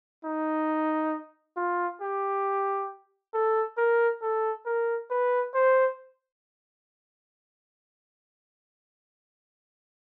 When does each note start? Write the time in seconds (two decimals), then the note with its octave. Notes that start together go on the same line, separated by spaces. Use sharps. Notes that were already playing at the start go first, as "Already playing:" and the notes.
0.24 D#4
1.57 F4
2.01 G4
3.34 A4
3.78 A#4
4.22 A4
4.66 A#4
5.10 B4
5.55 C5